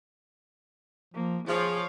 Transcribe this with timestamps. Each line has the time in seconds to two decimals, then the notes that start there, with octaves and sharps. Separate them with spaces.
1.14 F3 A#3
1.48 F3 G#4 C#5 F5